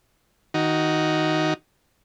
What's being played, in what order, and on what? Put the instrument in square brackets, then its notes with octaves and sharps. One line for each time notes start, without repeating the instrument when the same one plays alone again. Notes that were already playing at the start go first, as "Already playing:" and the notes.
[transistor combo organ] D#3 D#4 F#4